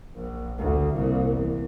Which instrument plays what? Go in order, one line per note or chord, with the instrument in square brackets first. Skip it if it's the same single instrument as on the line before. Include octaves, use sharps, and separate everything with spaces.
[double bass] A#1
D2
C2 A#2
E2